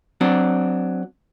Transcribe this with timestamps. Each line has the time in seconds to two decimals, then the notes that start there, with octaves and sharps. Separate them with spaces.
0.21 F#3 C4 D4